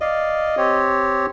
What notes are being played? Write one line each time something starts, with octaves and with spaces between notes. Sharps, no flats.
D5 D#5 F5
C4 G4 C#5